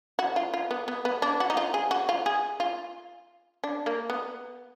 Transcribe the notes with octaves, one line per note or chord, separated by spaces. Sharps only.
F#4
F4
F4
B3
B3
B3
D4
F#4
D#4
F4
G#4
F#4
F4
G#4
F4
D4
A#3
B3